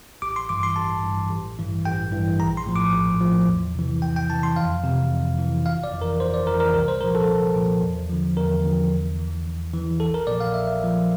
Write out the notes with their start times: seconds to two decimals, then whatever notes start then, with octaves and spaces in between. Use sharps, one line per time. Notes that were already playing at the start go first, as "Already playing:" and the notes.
0.22 A1 D6
0.36 C6
0.49 G2 E3 D6
0.63 C6
0.76 A1 A5
1.03 G2 E3
1.30 A1
1.58 G2 E3
1.85 A1 G5
2.12 G2 E3
2.39 A#1 A#5
2.57 C6
2.66 A2 F3
2.76 D6
2.94 A#1
3.20 A2 F3
3.47 E2
3.75 C3 E3
4.02 E2 G5
4.16 G5
4.29 C3 E3 A5
4.43 C6
4.56 F2 F5
4.83 C3 E3
5.11 F2
5.38 C3 E3
5.65 G1 F5
5.84 D5
5.93 F2 E3
6.02 A#4
6.20 G1 C5
6.34 D5
6.47 F2 E3 A#4
6.60 A#4
6.73 C2 A#4
6.88 C5
7.01 A#2 F3 A#4
7.15 A4
7.28 C2
7.55 A#2 F3
7.82 E2
8.09 D3 F3
8.37 E2 A#4
8.64 D3 F3
8.92 E2
9.19 E3
9.45 E2
9.73 E3
10.00 A#1 A4
10.14 A#4
10.27 A#2 F3 D5
10.40 F5
10.54 A#1 E5
10.81 A#2 F3